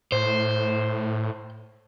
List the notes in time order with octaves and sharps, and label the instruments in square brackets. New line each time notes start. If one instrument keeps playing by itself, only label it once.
[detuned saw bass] A2 [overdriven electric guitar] C5